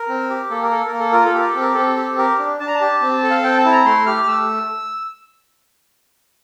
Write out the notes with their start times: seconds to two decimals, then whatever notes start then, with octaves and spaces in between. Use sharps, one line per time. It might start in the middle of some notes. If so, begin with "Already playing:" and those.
Already playing: A#4
0.08 C4
0.30 G4
0.50 A#3 A4
0.62 A#4
0.71 A4
0.87 A#3 A#4
0.99 A4
1.12 F4 A#4
1.25 A4
1.34 G4 A#4
1.49 A4
1.55 C4
1.61 A#4
1.74 C4 A4
1.97 G4
2.18 G4 A#4
2.39 D4
2.60 D4 A5
2.68 A#5
2.75 A5
2.81 G4
3.02 C4
3.23 A4
3.30 F5
3.43 C4 G5
3.58 A5
3.65 E4
3.72 A#5
3.85 A3 C6
4.06 G4 F6
4.23 F6
4.27 A3 E6